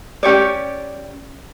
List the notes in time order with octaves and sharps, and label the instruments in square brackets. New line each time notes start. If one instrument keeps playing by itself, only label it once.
[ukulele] C#4 G4 C#5 D5